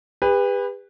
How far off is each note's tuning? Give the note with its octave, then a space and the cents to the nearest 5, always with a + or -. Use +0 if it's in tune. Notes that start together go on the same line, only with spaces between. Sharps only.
G4 +45 B4 +0